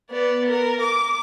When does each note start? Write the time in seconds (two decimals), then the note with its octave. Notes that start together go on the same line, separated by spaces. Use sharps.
0.11 B3 D5
0.48 A#4
0.81 D6